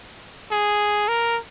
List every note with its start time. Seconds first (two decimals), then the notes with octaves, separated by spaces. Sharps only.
0.51 G#4
1.08 A#4